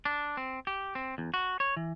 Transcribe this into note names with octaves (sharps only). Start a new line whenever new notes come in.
D4
C4
G4
C4
E2
F#4
C#5
E3